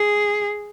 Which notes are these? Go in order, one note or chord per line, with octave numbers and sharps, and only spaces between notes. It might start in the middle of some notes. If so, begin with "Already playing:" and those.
Already playing: G#4